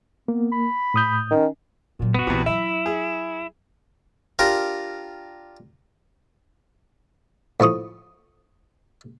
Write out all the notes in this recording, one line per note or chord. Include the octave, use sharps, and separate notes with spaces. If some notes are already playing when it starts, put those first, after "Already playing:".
A#3 B3
B5
A2 D#6 G6
D#3 C#4
A#2 F#3
F#1 B3 F#4
A#1 E2 C3
F#3 E4 E5
G#4
D4 F4 G4 A#4
A2 F3 C#6 D#6